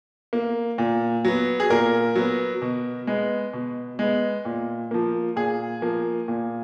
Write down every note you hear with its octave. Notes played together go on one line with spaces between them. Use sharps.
A#3
A#2
F#3 B3
G#4
A#2 A#4
F#3 B3
B2
G#3 B3
B2
G#3 B3
A#2
F3 A#3
A#2 G#4
F3 A#3
A#2